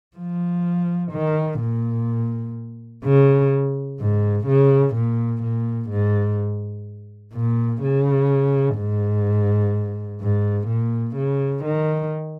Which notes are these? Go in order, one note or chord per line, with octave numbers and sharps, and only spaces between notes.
F3
D#3
A#2
C#3
G#2
C#3
A#2
A#2
G#2
A#2
C#3
G#2
G#2
A#2
C#3
D#3